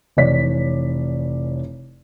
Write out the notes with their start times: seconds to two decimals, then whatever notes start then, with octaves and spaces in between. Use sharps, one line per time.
0.17 F1 E3 C#5 D5 B6